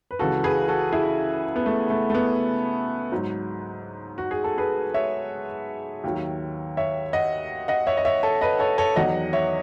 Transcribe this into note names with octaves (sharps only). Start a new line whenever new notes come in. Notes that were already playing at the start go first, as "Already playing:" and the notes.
B4
C#2 C#3 E3 F#4 A4
G#4 B4
F#4 A4
E4 G#4
B3
A3
A3
A3
B3
G#2 F#3
F#4
G#4
A4
G#4 B4
C#5 E5
D#2 D#3 F#3
C#5 E5
D#5 F#5
D#5 F#5
C#5 E5
D#5
C#5 E5
A4 C#5
B4 D#5
A4 C#5
A4 C#5
E2 D#3 F#3 D#5 F#5
C#5 E5